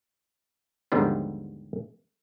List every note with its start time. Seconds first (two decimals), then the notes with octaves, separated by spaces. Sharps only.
0.92 D#2 G#2 D3 F3 G3 B3